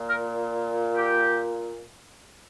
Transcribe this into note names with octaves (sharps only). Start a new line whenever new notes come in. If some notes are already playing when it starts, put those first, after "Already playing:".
Already playing: A#2
A#4
G4